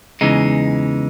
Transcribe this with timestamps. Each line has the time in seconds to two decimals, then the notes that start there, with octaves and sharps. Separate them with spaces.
0.21 E2 C#3 E3 G#3 D#4